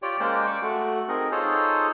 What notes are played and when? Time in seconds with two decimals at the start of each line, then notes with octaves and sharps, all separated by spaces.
0.02 F4 G4 C#5 D5 G5
0.20 G#3 A#3 C#4 C5 D5 G5
0.47 C#6 D6
0.62 A3 F#4
1.09 C4 D#4 G#4 A#4
1.32 D#4 F4 G#4 A4 C5 C#5